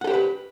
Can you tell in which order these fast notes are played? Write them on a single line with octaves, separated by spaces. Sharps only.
F#5 A4 G4 C5 B4